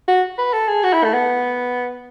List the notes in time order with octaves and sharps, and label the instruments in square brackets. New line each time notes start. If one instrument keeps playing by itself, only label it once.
[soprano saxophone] F#4
B4
A4
G#4
F#4
E4
A3
B3